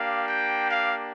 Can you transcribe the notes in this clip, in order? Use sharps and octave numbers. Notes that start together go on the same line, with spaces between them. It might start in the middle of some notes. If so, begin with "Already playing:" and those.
Already playing: A#3 D4 G4 F5
G5
F5